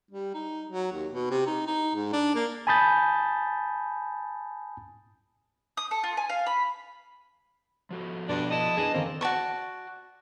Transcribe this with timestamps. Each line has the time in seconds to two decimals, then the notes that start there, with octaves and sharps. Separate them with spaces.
0.11 G3
0.34 D#4
0.70 F#3
0.92 D#2
1.11 B2
1.31 C3
1.47 D#4
1.67 D#4
1.95 G#2
2.13 D4
2.35 A#3
2.67 G#5 A5 B5 D#6 G6 A6
5.77 D#6
5.91 A4
6.04 F4
6.17 G#5
6.30 F5
6.46 B5
7.91 F3 F#4 A4
8.29 G2 B2 D4
8.51 E4 D#5 A5
8.78 E3 D4 G#4 D#5
8.94 D3 D#3 A#3 C4 G5
9.21 F#4 D5 A5 C#6